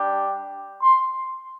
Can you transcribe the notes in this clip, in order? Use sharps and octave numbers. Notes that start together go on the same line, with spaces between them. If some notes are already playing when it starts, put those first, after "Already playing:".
Already playing: G3 D4 G4
C6